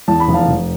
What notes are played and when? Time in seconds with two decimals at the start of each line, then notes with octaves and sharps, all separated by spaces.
0.08 E2 A5
0.20 B5
0.28 F1
0.34 F5 A5
0.49 F1